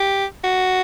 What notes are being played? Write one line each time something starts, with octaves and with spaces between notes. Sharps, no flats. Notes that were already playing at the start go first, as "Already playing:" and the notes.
Already playing: G4
F#4